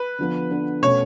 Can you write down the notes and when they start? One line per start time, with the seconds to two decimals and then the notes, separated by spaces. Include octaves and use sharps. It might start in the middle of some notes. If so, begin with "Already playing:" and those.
Already playing: B4
0.19 D3 F3 B3
0.50 D3 F3 B3
0.82 B2 A3 C#4 C#5